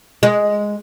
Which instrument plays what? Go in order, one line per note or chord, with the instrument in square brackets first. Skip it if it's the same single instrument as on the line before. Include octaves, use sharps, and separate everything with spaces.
[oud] G#3